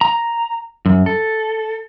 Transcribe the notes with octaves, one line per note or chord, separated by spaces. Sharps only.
A#5
F#2
A4